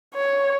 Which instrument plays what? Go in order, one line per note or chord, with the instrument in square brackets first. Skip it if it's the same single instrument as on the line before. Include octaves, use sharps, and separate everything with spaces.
[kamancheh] C#5